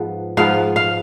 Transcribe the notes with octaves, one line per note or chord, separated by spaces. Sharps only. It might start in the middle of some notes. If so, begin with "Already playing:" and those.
Already playing: G#2 F3 B3
G#2 F3 B3 F5
F5